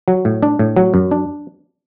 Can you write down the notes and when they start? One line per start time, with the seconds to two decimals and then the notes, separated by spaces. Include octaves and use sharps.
0.08 F#3
0.25 A2
0.43 D4
0.59 A2
0.77 F#3
0.94 F#2
1.11 D4